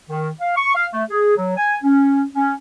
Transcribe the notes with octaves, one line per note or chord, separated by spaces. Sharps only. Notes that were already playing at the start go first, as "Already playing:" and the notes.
D#3
F5
C#6
F5
A3
G#4
F#3
G#5
C#4
C#4